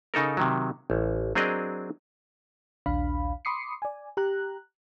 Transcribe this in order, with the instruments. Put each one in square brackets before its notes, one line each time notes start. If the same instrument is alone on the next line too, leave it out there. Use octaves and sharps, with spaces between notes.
[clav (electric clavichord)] C#3 D#4 A4 A#4
C3 D#3 F#3
A1
F#3 C4 D4 G#4 A#4 D#5
[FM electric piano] A#1 D#2 D4 F5 B5
B5 C6 D6 D#6 C7 C#7
D5 G#5
G4 A#5 F#6